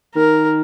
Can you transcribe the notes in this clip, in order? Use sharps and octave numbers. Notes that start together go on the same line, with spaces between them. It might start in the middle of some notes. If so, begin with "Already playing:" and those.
D#3 A#4